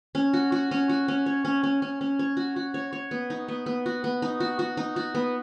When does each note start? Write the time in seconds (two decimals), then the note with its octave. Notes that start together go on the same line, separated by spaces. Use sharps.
0.15 C#4
0.34 F#4
0.52 F#4
0.71 C#4
0.89 F#4
1.08 C#4
1.26 C#5
1.45 C#4
1.63 C#4
1.82 C#4
2.01 C#4
2.19 C#5
2.37 F#4
2.56 F#4
2.74 C#5
2.93 C#5
3.11 B3
3.30 D#4
3.48 B3
3.66 B3
3.86 F#4
4.04 B3
4.22 D#4
4.40 F#4
4.59 F#4
4.77 D#4
4.96 F#4
5.15 B3